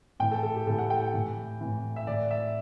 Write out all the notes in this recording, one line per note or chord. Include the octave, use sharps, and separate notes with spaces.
A2 E3 G5
A4
A4
G4
A2 E3 A4
F#5
G5
G5
A2 E3
A2 E3
E5
A2 E3 D5
E5